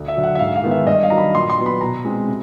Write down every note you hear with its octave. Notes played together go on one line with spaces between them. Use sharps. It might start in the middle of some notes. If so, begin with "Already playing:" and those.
Already playing: D2
E5
D3 F#3
F#5
E5
G#2 F5
F5
D#3 G#3 B3
E5
G2 D#5
F5
D#3 F#3 A#5
B5
A#2 C6
C6
F#3 B3
B5
B2 A#5
G#3 C4
C3